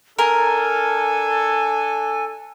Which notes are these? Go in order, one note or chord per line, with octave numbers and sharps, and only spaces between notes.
D4 A4 A#4 G#5